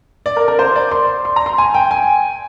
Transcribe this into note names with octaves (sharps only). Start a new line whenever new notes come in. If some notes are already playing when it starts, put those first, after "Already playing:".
D5
A#4
A#4
C5
D5
C6
C6
A#5
C6
G#5
G5
G#5